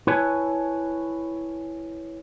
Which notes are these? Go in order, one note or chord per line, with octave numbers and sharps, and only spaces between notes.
E4 B4 C#5 G#5 A5